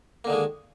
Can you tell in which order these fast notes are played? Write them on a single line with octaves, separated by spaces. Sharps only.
A#3 D3 D#3 G#3